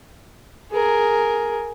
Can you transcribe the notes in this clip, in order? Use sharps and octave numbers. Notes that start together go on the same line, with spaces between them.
G#4 A#4